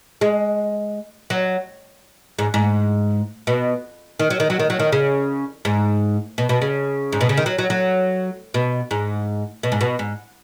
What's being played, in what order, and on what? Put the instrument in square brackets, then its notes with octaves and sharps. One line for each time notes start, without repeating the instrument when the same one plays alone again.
[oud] G#3
F#3
G#2
G#2
B2
D#3
F#3
D#3
F#3
D#3
F#3
D#3
C#3
G#2
B2
B2
C#3
G#2
B2
C#3
D#3
F#3
F#3
F#3
B2
G#2
B2
G#2
B2
G#2